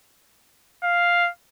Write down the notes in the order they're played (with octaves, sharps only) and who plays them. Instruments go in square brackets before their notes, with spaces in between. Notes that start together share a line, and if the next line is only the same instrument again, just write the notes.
[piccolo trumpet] F5